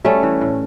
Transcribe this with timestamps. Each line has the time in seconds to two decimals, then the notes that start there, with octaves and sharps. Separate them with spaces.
0.04 G3 A3 C#4
0.23 E3
0.41 A2